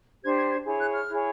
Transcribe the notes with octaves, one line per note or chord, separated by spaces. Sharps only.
D4 G4 C5 G#6
G#6
G#6
E4 G#4 C#5
F#6
F6
E4 G#4 C#5